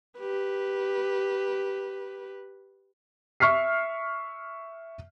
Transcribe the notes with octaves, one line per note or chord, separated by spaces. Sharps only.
G4 B4
E5 C#6 F6 B6 C7